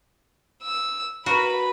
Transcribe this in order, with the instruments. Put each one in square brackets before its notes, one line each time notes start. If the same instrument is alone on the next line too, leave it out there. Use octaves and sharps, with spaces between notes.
[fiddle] E6
[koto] F#4 A#4 [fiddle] B4 B5